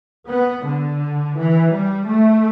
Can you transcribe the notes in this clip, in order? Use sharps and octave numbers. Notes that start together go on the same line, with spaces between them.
B3
D3
E3
G3
A3